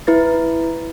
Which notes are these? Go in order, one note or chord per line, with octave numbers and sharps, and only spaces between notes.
E4 B4 A6